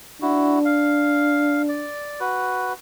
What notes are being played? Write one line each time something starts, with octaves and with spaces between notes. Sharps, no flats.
D4 E4 F#4
F5
D5
F#4 B4